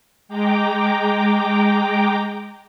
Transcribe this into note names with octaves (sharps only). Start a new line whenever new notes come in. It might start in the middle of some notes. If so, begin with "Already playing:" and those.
G#3 G5 A#5 D6